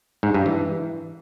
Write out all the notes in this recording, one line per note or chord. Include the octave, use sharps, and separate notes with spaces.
G#2
G2
E3